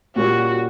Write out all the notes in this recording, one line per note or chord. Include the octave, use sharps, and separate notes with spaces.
A#2 G3 A#3 C#4 F#4